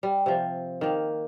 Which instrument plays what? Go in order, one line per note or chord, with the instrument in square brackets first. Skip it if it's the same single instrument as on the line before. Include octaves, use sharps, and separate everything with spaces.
[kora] G3
C3 F3
D#3 A#3